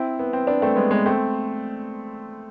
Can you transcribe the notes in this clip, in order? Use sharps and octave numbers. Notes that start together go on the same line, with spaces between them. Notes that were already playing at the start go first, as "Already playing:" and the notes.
Already playing: C4 E4
B3
C4
B3 D4
A3 C4
G#3 B3
G#3 B3
A3 C4